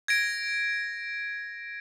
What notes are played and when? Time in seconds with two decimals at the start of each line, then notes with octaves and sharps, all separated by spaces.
0.08 G#6 A#6 D7